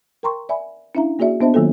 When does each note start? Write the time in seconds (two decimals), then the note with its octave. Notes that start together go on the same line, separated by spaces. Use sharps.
0.23 A#4 G5 A#5 C6 C#6
0.49 D5 E5 G#5 B5
0.95 C#4 D4 E4 E5 F5 A#5
1.19 A#3 F#4 G#4 D5 E5
1.41 B3 D4 C5 D#5 E5 A5
1.54 D#3 F#3 A#3 F4 A4